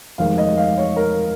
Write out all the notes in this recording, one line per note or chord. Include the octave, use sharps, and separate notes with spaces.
F1 D#2 D#3 G#3 F5
D#5
F5
C#5
A#4